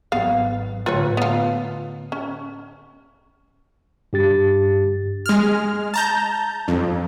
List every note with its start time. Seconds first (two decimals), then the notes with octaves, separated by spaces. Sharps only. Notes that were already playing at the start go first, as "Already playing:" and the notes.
0.12 G#1 F#3 B3 F5
0.86 A2 D3 F4 B4 C#5
1.17 B3 F4
2.12 C#4
4.13 G2 G4 A6
5.26 G#3 F6
5.94 A5 A#5 G6
6.68 F2